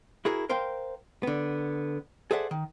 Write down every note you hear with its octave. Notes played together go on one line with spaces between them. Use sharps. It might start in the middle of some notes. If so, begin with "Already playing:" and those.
E4 F#4 G#4 A#4
A#4 C5 F5 G5 C6
D3 B3
G#4 A4 C5 D5 E5 F#5
D#3